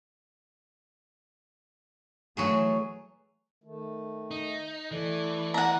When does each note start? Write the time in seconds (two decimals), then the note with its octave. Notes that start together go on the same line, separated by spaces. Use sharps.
2.37 E3 F#3 A3 F#4 G#4
3.64 D#3 A3
4.31 D#4
4.91 E3 A3 A4 D5
5.54 F#5 A#5